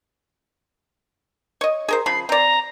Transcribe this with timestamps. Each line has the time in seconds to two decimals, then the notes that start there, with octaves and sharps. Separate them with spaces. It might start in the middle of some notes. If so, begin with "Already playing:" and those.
1.61 C#5 D#5
1.88 G#4 A#4 C5
2.06 C#3 F3 B5 C7
2.29 C4 D5 A#5